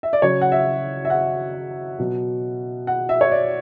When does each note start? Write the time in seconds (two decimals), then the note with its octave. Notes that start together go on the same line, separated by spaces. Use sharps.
0.03 E5
0.13 D5
0.22 C#3 F#3 C#5
0.41 F#5
0.52 E5
1.05 E5
1.10 F#5
1.99 B2 F#3
2.87 F#5
3.09 E5
3.21 C#5
3.32 D5